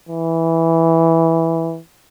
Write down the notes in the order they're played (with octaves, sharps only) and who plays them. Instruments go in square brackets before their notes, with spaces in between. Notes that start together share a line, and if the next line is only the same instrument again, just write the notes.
[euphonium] E3